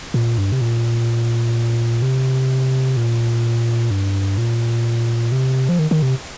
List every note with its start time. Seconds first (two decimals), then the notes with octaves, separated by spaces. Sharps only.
0.14 A#2
0.38 G2
0.52 C3
0.61 A#2
2.02 C3
2.97 A#2
3.91 G2
4.38 A#2
5.32 C3
5.69 F3
5.79 D#3
5.91 D#3
6.02 C3